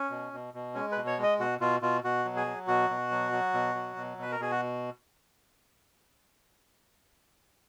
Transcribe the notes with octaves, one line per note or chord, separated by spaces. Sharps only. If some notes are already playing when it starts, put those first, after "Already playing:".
Already playing: C#4
B2
B2
B2
G#3 C#4
B2 B4
C#5
G#3 D#5
B2 F#4
B2 F4
B2 F4
B2 F#4
F#3
G#4
F#3
B2 F#4
B2
F#3
F#3
B2
F#3
B2
B2 B4
A#4
B2 G#4
F#4